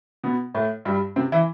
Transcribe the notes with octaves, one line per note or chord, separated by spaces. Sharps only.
B2 B3
A2 A3
G2 G3
C3 C4
E3 E4